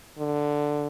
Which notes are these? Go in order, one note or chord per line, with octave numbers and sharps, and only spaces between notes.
D3